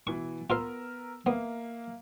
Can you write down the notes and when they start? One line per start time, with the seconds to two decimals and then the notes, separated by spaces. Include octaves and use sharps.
0.07 B2 E3 C#6
0.50 B3 F4 A#4 B4 F5 E6
1.26 A#3 B3 E5